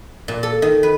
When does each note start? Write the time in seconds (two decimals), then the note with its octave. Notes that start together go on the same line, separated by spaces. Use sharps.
0.28 A#2
0.43 A4
0.62 D#3
0.83 B4